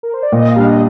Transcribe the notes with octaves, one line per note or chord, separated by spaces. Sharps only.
A#4
C5
D5
A#2 D#5
F5
G3 D4
D#5